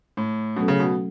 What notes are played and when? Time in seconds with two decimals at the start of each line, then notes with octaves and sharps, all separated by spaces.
0.17 A2
0.56 B2 F#3 A3 C#4 F#4 A4
0.68 C#3
0.80 B2